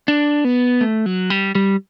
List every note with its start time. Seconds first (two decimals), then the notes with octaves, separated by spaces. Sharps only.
0.08 D4
0.45 B3
0.81 A3
1.06 F#3
1.30 G3
1.55 G3